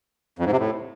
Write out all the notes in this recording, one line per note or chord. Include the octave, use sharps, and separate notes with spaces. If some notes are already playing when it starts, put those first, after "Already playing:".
F2
G#2
C3
A2